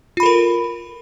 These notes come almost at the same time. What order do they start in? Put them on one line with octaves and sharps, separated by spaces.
F4 B5 A4 A#4